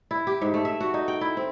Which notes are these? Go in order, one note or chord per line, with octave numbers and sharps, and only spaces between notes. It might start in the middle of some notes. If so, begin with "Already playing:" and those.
E4
G4
G#2
A3
E5
F#4
D#4
G5
E4
C4